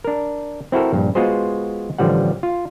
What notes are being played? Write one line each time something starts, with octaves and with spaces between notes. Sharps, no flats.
D4 A#4
C4 E4 F#4 A4 A#4
A#1 G2
G#3 B3 F4 F#4 G#4 C5
A1 D3 F3 G3 F#5
F4